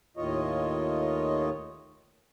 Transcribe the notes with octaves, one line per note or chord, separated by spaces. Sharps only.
D#2 A2 D#3 F4 C#5 D#5